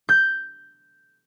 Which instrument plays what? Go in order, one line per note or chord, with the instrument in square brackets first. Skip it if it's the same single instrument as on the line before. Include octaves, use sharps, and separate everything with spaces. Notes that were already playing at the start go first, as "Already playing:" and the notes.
[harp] G6